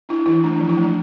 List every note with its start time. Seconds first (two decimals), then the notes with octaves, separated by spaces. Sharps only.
0.09 D4 E4
0.26 E3 E4
0.44 A3 D4
0.56 D4
0.60 F3
0.69 E4
0.77 A3
0.82 D4